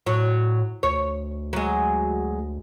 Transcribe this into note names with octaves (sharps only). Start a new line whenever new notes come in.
A2 F#3
D2 C#5
F#3 G#3